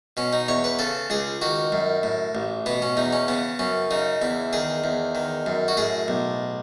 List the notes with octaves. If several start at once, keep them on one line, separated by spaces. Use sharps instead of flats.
B2 C#4
D#4
E2 C#5
B4
C#3 A4
C#2 G#4
D#3 F#4
F#2
A2
A1
B2 B3
C#4
E2 D#4
C#4
C#3 B3
F#2 C#4
C#3 D#4
E2 E4
D#3 G#4
E2
D#3
F#2
F#4
A2 G#4
B1